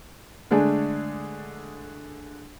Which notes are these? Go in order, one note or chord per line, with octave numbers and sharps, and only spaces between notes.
D3 G#3 A3 D4 G#4